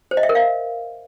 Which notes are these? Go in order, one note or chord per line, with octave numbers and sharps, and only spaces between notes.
C5
D#5
E5
A#4
F5